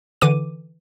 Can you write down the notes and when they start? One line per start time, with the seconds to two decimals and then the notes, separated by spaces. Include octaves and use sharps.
0.21 D3 E3 D6 D#7